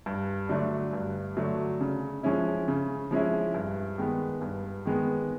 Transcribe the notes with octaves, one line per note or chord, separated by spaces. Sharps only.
G2
D3 F#3 A3 D4
G2
D3 F#3 A3 D4
C#3
F3 G#3 C#4 E4
C#3
F3 G#3 C#4 E4
G2
D#3 G#3 B3
G2
D#3 G#3 B3